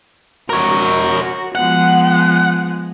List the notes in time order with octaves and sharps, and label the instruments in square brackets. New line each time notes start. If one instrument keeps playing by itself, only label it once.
[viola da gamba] F#4 [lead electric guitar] A#4 C#5
[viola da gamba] F3 G#3 B3 [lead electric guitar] F#5